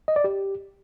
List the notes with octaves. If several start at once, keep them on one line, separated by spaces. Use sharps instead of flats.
D#5
D5
G4